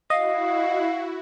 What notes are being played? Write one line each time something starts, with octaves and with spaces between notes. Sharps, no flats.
E4 F#4 D#5 F5